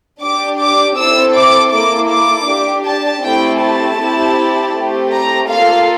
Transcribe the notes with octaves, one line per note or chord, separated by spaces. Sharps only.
D4 G4 D6
D6
C4 E4 A4 E6
D6
A#3 E4 A4 D6
D6
D4 G4
A5
A3 C4 E4 G4 G5
A5
C4 E4 G4
A3 C4 G4
A#5
A#3 F4 A4 F5